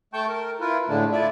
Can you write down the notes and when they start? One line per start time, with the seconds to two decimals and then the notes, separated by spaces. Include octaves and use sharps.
0.13 A3 G5 A5 C#6 G6
0.28 A#4
0.60 E4 F4 A#4 B4
0.89 A2 D3 G#3 A3 D4
1.12 E4 F4 D5 E5